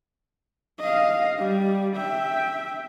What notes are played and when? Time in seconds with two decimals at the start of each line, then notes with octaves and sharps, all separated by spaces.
0.80 D#5 F5
1.38 G3
1.96 E5 G5